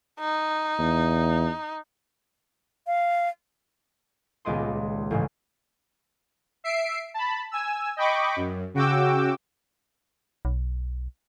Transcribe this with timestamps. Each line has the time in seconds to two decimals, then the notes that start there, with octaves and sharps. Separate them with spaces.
0.20 D#4
0.79 E2
2.86 F5
4.45 D#1 C#2 B3 D5 D#5 C6
5.11 A1 G#2 C#3
6.64 E5 C7 D7
7.14 A5 B5
7.51 G#5 E6
7.97 D#5 G5 B5 C#6 D6
8.36 F#2
8.74 C#3 F#4 G5 D6 E6
10.45 B1